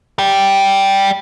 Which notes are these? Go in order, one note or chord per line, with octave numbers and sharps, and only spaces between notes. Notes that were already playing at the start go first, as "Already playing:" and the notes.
D5 G5